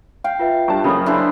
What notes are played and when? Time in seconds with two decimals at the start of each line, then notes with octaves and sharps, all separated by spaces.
0.24 F5 G5
0.39 F4 B4 E5
0.68 G2 G3 A5
0.84 F#1 C#3 B5 D#6
1.06 D4 E4 C5